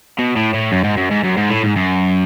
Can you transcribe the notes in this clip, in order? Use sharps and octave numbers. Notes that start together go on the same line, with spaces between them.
B2
A2
A2
F#2
G#2
F#2
G#2
F#2
G#2
A2
G#2
F#2